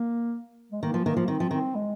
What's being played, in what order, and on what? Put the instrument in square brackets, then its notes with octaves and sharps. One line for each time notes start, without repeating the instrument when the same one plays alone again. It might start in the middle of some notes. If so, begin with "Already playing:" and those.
Already playing: [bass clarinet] A#3
G#3
[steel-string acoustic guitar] D#3 [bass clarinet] A#3
[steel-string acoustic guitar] F3
[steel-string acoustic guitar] D#3 [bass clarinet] A#3
[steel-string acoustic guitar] F3
[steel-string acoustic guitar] D#3 [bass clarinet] C4
[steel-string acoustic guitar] F3
[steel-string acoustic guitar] D#3 [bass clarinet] C4
[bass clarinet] G#3